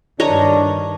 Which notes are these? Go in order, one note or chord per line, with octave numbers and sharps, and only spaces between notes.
G2 D#3 D4 C#5 D#5 A#5